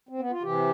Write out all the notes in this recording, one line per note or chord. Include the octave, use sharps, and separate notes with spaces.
C4
B3
F4
C3 E3 G4